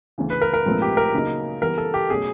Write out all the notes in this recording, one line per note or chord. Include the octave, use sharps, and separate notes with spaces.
D2 C#3 E3
B4
A#4
A#4
A#1 G#2 F3 A3 C4
G4
A#4
C#3 F#3 A#3 D#4
E3 G3 B3 A#4
A4
G4
B2 F#3 A3 C#4 G#4